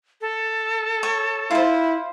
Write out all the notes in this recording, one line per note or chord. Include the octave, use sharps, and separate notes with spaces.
A4
C#5
E4 F4 C5